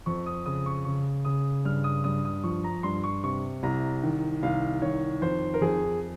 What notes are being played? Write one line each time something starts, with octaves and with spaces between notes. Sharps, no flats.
F2 C#6
D#6
C#3 D#6
C#6
C#3 C#6
C#3 D#6
G2 F6
D#6
G2 D#6
D#6
F3 C#6
A#5
G2 C6
C#6
C3 C#6
C2 A#5
D#3
C2 F5
D#3 C#5
F2 C5
A#4
F2 G#4